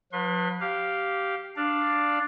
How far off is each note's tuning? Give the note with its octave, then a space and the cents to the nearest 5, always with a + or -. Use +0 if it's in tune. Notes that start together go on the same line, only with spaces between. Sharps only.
F3 +45 B4 -15 C6 +30
G4 -10 F5 +0
D4 +5 D5 +0 F5 +0